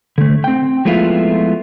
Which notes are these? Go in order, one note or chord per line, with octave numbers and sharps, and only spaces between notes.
D3 A3
C4 G5
F3 G#3 A3 B3 E4 F4